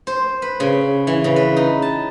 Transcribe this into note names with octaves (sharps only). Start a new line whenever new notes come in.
C5
B4
C#3
E3
C#3
B4
D#4
A5